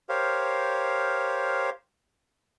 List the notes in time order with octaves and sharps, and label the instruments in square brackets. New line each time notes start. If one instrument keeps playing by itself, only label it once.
[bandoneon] G4 A#4 C5 C#5 F5